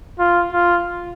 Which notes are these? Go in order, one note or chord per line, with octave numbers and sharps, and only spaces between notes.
F4
F4